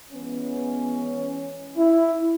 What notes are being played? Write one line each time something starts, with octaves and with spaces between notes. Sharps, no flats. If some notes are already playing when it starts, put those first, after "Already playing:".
E3 G#3 B3 C#4
E4